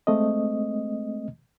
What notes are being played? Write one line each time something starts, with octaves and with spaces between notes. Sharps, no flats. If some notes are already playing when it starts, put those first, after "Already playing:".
G#3 A3 C4 D#5